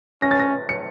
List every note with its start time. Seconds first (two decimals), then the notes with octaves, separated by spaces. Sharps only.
0.22 C#4 A#6
0.31 A6
0.39 A#6
0.69 C#7